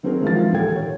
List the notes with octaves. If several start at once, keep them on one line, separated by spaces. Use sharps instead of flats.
D#3 F#3 C4 D4 G#4 A#4
G#2 E3 F3 F4 A6
D#2 A#2 A#3 A4 G5 G#6
C#5